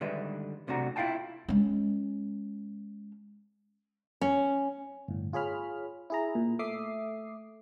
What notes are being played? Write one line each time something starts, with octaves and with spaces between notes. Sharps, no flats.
D3 D#3 G3 G#3 B4 E5
B1 C3 A3 D4 F#4 A#5
E4 F4 F5 G5 A5
G#3 C#4
C#4
G1 A2
F4 G#4 C#5 B5 F6
E4 G#4 A#5
A#2
A3 E5 D6 D#6 C7